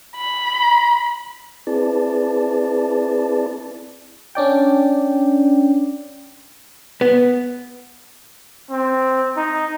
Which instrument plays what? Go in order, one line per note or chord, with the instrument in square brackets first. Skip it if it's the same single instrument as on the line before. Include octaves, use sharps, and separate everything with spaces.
[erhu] B5
[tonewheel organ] C4 E4 G#4 B4 D5 A5
[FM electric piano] C#4 D4 D5 G5
[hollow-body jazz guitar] B3
[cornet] C4
D#4